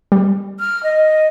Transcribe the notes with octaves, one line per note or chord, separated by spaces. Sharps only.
G3
F6
D#5